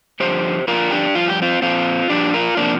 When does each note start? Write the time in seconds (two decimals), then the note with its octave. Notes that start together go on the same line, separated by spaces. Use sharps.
0.20 G2 D3 F3 G4 C5
0.68 F2 D3 F3 F4 A#4
0.91 D4 G4
1.15 G2 F3 F4
1.28 G4
1.42 C4 F4
1.62 A#2 F3 C4 F4
2.10 A#2 F3 D4 G4
2.34 F4 A#4
2.57 C3 F3 A#3 D4